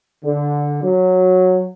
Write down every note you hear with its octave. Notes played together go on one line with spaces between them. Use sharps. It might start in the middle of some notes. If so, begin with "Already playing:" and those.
D3
F#3